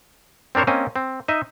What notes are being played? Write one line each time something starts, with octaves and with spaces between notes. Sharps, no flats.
C4 D4 A#4 C5 C#5
A#3 C4 C#4 D#5 G#5
C4
D#4 D#5 E5